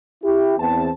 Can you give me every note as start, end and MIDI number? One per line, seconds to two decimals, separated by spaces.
0.24 0.55 64
0.24 0.55 67
0.58 0.89 40
0.58 0.89 52
0.58 0.89 60
0.58 0.89 81